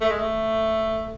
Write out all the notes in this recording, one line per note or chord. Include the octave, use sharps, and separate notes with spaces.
A3
G#3
A3